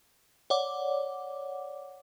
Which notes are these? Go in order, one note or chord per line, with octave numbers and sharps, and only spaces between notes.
C#5 D5 F#5 D6